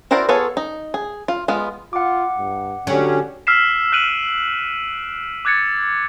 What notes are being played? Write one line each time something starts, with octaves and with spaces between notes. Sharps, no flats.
E4 F#4 A#4 C5 D5
B3 F4 G#4 A4 C#5
D#4
G#4
F4
G#3 B3 F4
F4 F#5 D6
G2
D3 F#3 C#4 G4
E6 F6 B6 C7 E7
F6 F#6 B6 D7 D#7 F#7
D6 F#6 G#6 A6 C#7